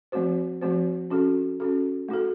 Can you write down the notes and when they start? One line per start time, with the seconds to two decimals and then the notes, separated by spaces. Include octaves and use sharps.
0.12 F3 A3 C4 F#4 C5
0.62 F3 A3 C4 F#4 C5
1.10 C#4 F#4 A4
1.60 C#4 F#4 A4
2.08 A3 D#4 F#4 A4